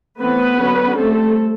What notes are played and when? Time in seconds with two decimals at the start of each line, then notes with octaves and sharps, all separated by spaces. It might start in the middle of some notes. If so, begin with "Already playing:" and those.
0.20 E3 A3 B3 C4 B4
0.58 D3 F#3 A#3 C#4
0.97 G3 A3 C4 A4